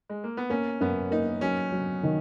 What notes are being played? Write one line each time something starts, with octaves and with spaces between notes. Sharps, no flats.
G#3
A#3
B3
A#3 C#4
F#2 B3
A#3 D#4
F#3 C#4
F#3
D#3